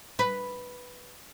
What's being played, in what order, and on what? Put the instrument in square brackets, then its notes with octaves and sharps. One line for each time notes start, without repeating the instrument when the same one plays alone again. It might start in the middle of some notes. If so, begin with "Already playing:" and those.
[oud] B4